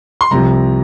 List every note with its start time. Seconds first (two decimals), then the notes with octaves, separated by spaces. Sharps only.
0.21 C6
0.31 C2 C3 F3 A#5